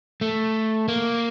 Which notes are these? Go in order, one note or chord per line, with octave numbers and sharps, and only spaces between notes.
A3
A#3